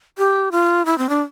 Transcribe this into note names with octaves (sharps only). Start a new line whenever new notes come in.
G4
F4
E4
C4
D4